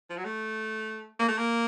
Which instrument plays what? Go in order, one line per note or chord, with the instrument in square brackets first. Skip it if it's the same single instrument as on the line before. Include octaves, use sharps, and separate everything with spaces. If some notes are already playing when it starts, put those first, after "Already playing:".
[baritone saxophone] F3
F#3
A3
A#3
A3
A#3